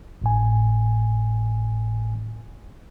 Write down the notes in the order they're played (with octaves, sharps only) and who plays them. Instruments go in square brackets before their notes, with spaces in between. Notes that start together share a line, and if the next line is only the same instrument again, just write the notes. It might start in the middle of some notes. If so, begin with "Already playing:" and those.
[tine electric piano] G#1 A2 G#5